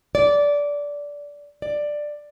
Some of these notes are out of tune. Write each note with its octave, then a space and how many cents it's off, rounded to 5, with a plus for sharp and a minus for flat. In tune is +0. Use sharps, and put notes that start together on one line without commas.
D5 -15
D5 +10